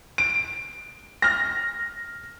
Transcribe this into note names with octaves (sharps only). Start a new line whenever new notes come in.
D7
F6 A#6